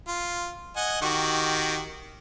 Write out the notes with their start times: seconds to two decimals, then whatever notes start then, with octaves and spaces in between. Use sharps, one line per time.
0.07 F4
0.76 D#5 F#5 G#5
1.02 D#3 F#4 G4